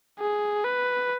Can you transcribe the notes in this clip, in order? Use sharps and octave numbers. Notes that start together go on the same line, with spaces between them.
G#4
B4